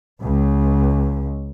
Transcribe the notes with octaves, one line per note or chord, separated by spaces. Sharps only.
C#2